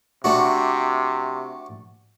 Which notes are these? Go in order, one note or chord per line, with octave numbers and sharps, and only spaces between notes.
C3 A3 D4 F#4